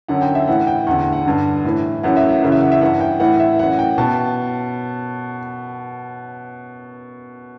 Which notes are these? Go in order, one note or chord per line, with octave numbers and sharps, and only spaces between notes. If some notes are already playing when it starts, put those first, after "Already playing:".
F#2 D3 F#5
G5
E5
A2 E3 F#5
G5
E2 D3 F#5
F#5
G2 D3
A2 E3
F#2 E3 F#5
E5
F#5
F#2 C#3 E3
E5
F#5
E5
G2 E3 F#5
G5
A2 E3 F#5
E5
F#2 E3 F#5
G5
B2 A5